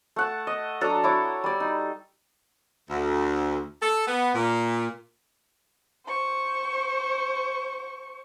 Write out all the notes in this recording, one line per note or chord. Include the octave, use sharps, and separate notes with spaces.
A3 F#5 A5
D#5
F#3 D4 A4 A#5
E4 C#5 D6
G3 D5
D#4
D2
A4
B3
A#2
C5 C#6